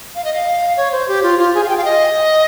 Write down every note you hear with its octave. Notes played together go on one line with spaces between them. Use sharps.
F5
D#5
F5
C#5
C5
G4
F4
F4
G#4
F5
G5
F5
D#5